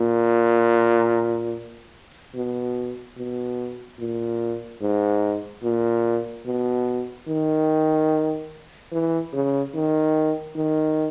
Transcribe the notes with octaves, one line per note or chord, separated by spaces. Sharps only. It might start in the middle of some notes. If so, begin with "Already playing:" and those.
Already playing: A#2
B2
B2
A#2
G#2
A#2
B2
D#3
E3
C#3
D#3
D#3